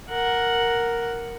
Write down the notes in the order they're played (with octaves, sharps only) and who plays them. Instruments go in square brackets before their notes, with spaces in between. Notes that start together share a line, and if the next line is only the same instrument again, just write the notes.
[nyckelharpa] A#4 F#5